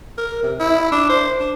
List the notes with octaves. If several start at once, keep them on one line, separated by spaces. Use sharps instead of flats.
A#4
C3
E4
D4
C5
D4